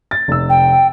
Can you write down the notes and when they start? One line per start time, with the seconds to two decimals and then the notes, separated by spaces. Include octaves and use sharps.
0.11 A6
0.28 F1 E6
0.50 G5